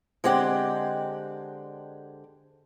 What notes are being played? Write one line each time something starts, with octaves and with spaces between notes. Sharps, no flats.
D3 G#3 C4 G4 F#5